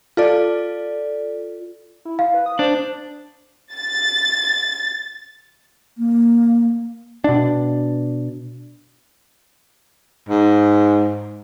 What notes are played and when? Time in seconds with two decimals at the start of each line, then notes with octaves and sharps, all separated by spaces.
0.17 F4 A4 D5
2.05 E4
2.19 F5
2.34 B4
2.46 D#6
2.59 D4 C5
3.74 A6
5.98 A#3
7.24 B2 D4
10.29 G#2